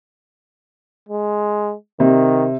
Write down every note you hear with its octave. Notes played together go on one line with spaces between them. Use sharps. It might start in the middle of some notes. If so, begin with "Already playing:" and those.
G#3
C3 D#3